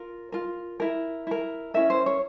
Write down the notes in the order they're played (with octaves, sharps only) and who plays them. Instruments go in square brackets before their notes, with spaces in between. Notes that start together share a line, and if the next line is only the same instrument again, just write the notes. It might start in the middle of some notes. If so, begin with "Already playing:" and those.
Already playing: [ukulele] F4 A#4
F4 A#4
E4 A#4
E4 A#4
C#4 E4 A#4 E5
C5
C#5